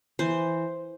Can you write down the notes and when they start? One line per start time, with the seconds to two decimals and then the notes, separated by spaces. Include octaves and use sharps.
0.19 E3 C5